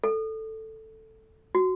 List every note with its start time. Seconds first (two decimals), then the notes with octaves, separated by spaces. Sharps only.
0.04 A4
1.55 F#4